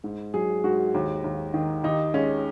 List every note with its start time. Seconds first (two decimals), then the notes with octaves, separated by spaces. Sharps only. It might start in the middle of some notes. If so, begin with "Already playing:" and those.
0.04 G#2
0.34 F#3 G#4
0.64 G#2 F#4
0.94 D#2
1.24 D#2
1.54 D#3
1.83 D#2 D#4
2.14 G#3 C#4